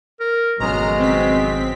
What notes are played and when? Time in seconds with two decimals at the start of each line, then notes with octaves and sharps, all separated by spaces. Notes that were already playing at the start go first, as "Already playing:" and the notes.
0.20 A#4
0.60 G#1 F#3 G#3 B3 C#4 G#4 A#5 F6
0.99 C4 B6